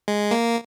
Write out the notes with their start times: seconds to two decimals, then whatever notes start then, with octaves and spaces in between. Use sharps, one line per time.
0.08 G#3
0.31 A#3